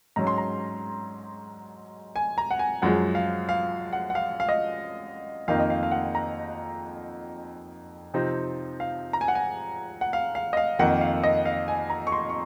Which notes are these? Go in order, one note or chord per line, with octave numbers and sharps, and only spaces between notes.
G#2 F#3 C#4 A#5
C6
A#5
G#5
A#5
F#5
G#5
F#2 F3 G#3 F#5
F5
F5
F#5
F#5
F5
F5
D#5
F2 D#3 A#3 D#4 F5
D#5
F5
F5
F#5
A#5
C3 F3 C4 D#4
F5
A#5
G#5
F#5
G#5
F#5
F5
F5
D#5
F5
F2 D#3 A#3 F#5
F5
D#5
F5
G#5
A#5
C#6
C6
C#6